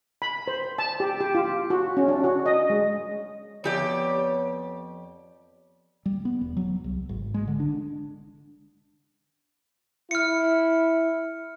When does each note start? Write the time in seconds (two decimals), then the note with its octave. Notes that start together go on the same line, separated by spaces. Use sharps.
0.22 B5
0.48 C5
0.79 A5
1.00 G4
1.20 G4
1.35 F4
1.70 F#4
1.97 C#4
2.08 D4
2.24 F#4
2.46 D#5
2.70 G#3
3.64 F2 B3 G4 C#5 D5
6.06 G3
6.25 B3
6.41 E1
6.57 F#3
6.84 C2
7.09 G#1
7.34 G#3
7.48 D3
7.60 D4
10.11 E4 F6 C#7